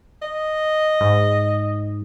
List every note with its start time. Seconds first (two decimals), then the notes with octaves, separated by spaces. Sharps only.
0.22 D#5
1.01 G#2